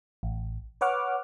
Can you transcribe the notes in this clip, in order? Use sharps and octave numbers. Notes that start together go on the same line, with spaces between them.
A1
B4 C#5 F#5 D6 F6